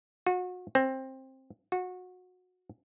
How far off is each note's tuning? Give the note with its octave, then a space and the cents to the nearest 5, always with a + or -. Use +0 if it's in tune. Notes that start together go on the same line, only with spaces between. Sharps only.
F#4 -35
C4 +15
F#4 -25